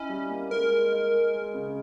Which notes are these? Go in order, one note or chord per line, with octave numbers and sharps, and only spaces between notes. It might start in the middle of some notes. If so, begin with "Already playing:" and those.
Already playing: C#4 D#4 E4
G3
A#3
G#3 A#4
G#3
D#4
G#3
G#3
C#3